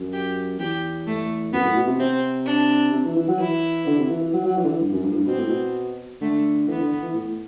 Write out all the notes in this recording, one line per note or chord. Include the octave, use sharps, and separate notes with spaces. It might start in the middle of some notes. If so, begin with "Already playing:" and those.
Already playing: F#2
G4
E2 G4
A3
F#2 B3
A2
B2
C3
C3 C4
D4
C3
E3
E3
F#3
E3 E4
D3
C3
E3
E3
F#3
F#3
E3
D3
E3
G2
F#2
G2
A2
G2
B2 C4
A2
B2
D3 A3
E3 B3
D3
E3
A2